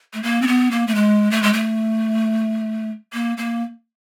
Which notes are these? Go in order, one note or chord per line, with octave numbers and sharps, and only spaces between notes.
A3
A#3
C4
B3
A#3
A3
G#3
A3
G#3
A3
A#3
A#3